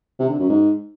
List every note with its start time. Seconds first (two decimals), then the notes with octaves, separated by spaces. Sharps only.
0.19 C3
0.29 D3
0.39 F#2
0.49 G#2